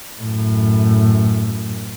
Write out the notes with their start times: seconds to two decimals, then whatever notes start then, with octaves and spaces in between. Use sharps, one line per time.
0.20 F#2 A2